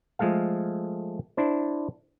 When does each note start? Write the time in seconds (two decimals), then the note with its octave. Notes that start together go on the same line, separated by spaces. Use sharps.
0.19 F3 G#3 A3 A4 F5
1.37 D4 E4 C5